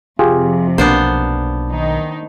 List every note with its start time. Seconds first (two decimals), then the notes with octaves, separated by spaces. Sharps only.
0.19 F2 C3 F4 G4 G#4
0.78 B1 A#3 B3 D4 C5
1.71 D#3 D#4